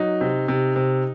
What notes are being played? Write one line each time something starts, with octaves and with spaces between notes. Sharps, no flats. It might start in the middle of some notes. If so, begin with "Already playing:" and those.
Already playing: F#3 D#4
C3
C3
C3